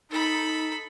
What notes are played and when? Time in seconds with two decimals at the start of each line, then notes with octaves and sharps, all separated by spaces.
0.11 D#4 A4 B5